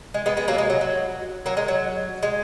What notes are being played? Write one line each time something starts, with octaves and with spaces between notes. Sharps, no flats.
G#3
G#3 B3
G#3 B3
F#3 A#3
G#3
F#3
F#3
F#3 A#3
G#3
F#3
G#3